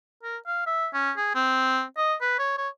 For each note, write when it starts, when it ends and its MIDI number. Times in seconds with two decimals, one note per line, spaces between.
0.23 0.37 70
0.47 0.64 77
0.67 0.88 76
0.94 1.11 61
1.17 1.34 68
1.35 1.83 60
1.97 2.14 75
2.21 2.39 71
2.39 2.57 73
2.58 2.69 73